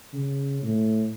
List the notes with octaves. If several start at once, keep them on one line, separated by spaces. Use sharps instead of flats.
C#3
A2